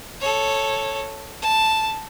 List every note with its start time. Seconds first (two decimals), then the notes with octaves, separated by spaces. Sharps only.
0.21 A4 C#5
1.42 A5